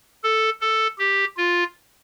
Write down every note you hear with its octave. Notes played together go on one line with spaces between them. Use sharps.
A4
A4
G4
F4